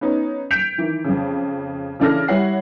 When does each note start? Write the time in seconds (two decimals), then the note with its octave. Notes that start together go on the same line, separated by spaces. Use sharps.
0.01 B3 C#4 D#4
0.51 G6 B6 C#7 D7 F7
0.78 D#3 E3
1.04 F2 C#3
2.00 C#3 E3 D4 A4 F6 A#6
2.28 G3 E4 C#5 F#5 C7